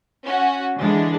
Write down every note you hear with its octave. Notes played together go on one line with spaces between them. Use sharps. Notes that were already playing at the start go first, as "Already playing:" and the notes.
C#4 F#4
D3 E3 G#3 D4